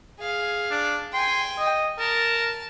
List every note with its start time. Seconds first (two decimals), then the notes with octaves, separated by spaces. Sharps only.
0.19 G#4 F5
0.71 D4
1.13 G5 G#5 C6
1.58 D#5
1.99 A#4 A5